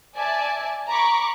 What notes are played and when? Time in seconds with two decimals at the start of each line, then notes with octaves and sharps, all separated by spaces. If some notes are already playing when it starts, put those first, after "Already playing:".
0.16 D5 E5 G#5 A5
0.88 A#5 B5 C#6 D6